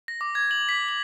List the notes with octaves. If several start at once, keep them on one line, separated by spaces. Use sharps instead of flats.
A#6
D6
G#6
F#7
B6
F#7